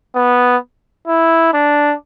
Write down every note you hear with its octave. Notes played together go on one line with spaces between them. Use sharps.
B3
E4
D4